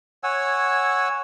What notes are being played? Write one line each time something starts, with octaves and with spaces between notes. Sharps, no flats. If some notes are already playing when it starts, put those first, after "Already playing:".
C#5 F#5 G#5 E6